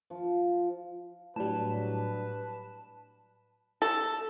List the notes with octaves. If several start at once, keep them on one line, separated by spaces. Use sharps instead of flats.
F3
A2 F#3 G3 D4 B4 A5
A4